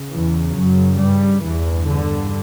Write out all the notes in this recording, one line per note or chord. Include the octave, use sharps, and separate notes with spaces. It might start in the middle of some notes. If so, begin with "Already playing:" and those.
Already playing: C#3
E2 E3
F#2 F#3
G2 G3
E2 G2 E3
D3